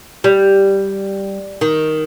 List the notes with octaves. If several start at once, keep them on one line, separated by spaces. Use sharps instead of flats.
G3
D#3